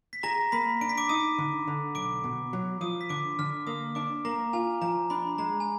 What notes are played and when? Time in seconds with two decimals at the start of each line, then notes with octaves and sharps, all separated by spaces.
0.13 B6
0.23 G#4 A#5 A#6
0.52 A#3 B5 B6
0.81 D4 D7
0.89 B6
0.97 D6 D7
1.09 D#4 D#6 D#7
1.38 D3
1.68 D3
1.95 B1 D6 D7
2.24 B2
2.53 F#3
2.81 F3 D#6 D#7
3.01 B6
3.09 D3 D6 D7
3.39 D3 F6
3.67 A#3 D#6
3.95 D4 D6
4.25 A#3 A#5
4.53 F4 G#5
4.82 F3 A#5
5.10 D4 B5
5.38 G#3 A#5
5.60 G#5